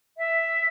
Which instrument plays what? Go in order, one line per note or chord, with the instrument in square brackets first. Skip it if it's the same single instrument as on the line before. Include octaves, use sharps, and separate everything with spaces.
[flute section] E5